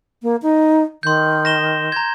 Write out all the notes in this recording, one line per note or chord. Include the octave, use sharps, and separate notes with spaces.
A#3
D#4
D#3 C6 G6
A#6 E7 G7
A#5 G#6